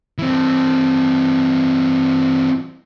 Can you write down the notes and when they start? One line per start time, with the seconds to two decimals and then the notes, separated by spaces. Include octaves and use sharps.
0.18 E3 C4